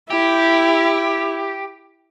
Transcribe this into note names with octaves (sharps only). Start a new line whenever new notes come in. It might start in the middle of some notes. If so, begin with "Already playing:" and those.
E4 G4